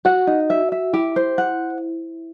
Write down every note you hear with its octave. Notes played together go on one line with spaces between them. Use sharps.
F#4 F#5
D#4
E5
E5
E4 G4
C5
F#5